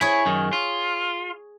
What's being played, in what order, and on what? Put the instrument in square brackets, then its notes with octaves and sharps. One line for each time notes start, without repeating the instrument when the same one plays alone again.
[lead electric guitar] E4 [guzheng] G#4 C#5
[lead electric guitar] F#2 D#3
F4